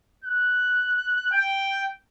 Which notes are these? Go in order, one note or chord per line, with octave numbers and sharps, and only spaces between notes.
F#6
G5